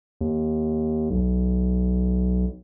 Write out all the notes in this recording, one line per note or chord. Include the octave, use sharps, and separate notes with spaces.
D#2
B1